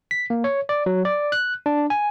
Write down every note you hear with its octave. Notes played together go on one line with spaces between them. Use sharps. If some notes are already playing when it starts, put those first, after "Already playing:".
B6
A#3
C#5
D5
F#3
D5
F#6
D4
G#5